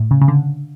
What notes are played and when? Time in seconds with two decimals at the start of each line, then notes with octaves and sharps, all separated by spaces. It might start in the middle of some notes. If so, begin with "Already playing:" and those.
Already playing: A2
0.11 C#3
0.22 C#3
0.28 D3